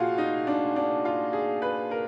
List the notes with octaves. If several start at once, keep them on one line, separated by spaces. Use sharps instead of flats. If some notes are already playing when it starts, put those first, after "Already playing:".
Already playing: A#2 F3 F4 F#4 G#4
D#4
D4
D4
F4
G#4
B4
A#4